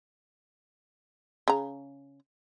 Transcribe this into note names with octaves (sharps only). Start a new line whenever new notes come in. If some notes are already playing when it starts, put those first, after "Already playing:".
C#3 A#5